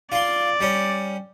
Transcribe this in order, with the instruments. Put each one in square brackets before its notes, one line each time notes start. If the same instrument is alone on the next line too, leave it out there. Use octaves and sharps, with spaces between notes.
[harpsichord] F4 C6 [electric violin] D5
[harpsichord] G3 C#4